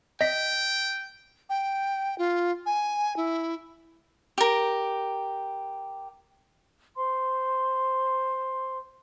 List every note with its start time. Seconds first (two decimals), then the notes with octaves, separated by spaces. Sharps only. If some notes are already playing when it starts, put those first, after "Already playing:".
0.21 D#5 G5 B6
1.50 G5
2.18 F4
2.66 G#5
3.17 E4
4.38 G4 A#4
6.96 C5 C6